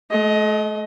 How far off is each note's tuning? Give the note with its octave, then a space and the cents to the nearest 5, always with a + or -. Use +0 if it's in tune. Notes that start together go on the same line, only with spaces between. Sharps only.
A3 -40 D#5 +15